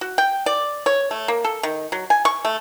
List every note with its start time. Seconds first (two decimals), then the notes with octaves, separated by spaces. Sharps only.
0.01 F#4
0.18 G5
0.46 D5
0.86 C#5
1.11 A3
1.28 A#3
1.44 A4
1.63 D#3
1.92 F#3
2.10 G#5
2.25 C#6
2.45 A3